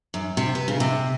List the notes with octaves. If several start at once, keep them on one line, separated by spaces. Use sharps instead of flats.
F#2
C3
B4
C#3
C3